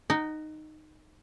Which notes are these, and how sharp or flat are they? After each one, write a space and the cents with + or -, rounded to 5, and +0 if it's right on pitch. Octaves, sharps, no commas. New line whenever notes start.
D#4 -10 F#5 +25